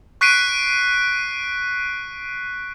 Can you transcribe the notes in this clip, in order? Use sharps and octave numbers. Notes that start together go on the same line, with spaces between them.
C#6 F#6 B6 C7 D7 D#7